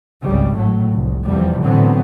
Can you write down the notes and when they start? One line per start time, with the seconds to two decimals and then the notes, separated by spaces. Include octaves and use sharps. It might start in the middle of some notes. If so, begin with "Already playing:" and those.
0.23 G#1 C#2 C#3 G3
0.55 A2 F#3 A3
0.94 F1 C2
1.26 F1 E2 C3 E3 F3 G3
1.62 A2 D3 E3 F#3 B3 C4